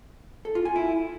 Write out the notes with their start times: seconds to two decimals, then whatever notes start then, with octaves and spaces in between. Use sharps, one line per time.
0.45 A4
0.55 F4
0.65 G#5
0.76 E4